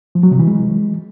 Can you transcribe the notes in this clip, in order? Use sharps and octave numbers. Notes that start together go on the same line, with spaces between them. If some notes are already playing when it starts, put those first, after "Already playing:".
F3
F#3
C3
E3
G#3